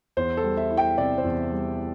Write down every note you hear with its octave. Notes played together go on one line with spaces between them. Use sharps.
E2 C5
A4
G3
E5
E4
G5
C3 D5
C5
E2
G3
E4